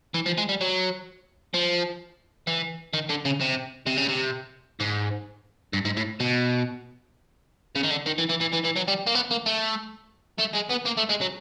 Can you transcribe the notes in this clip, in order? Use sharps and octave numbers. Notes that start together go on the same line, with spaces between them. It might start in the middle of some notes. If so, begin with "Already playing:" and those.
E3
F3
G#3
G3
F#3
F3
E3
D#3
D3
C#3
C3
C3
C#3
C3
G#2
G2
G#2
A2
B2
C#3
D#3
D3
D#3
E3
E3
E3
E3
E3
F#3
G3
A#3
B3
A#3
A3
A3
G#3
B3
A#3
A3
G#3
F#3